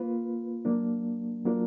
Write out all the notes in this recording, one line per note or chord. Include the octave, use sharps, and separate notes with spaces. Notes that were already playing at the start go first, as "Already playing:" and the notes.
Already playing: A#3 F4 B4
F#3 A#3 D4
F#3 A#3 D4 F4 A#4